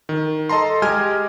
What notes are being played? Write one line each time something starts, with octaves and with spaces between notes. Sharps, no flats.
D#3
A4 D#5 A5 A#5 C6
G#3 G4 D#5 G#5 F6 G#6